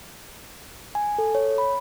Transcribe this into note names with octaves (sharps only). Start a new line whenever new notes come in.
G#5
A4
C#5
B5